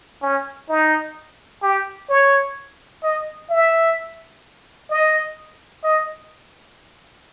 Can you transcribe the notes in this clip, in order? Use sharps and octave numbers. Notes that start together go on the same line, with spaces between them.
C#4
D#4
G4
C#5
D#5
E5
D#5
D#5